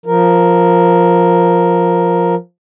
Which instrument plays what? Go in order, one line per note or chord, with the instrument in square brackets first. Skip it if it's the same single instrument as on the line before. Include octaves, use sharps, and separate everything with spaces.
[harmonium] F3 A#4